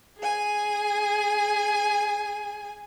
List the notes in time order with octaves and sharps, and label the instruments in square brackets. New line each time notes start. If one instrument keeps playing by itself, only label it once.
[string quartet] G#4 G#5